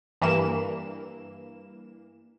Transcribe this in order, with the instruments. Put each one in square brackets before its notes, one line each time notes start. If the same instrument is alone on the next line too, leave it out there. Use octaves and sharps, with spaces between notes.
[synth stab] G2 E3 A#3 E7